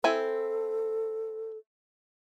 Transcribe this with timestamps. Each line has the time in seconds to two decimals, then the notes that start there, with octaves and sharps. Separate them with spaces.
0.04 C4 E4 A4 G#5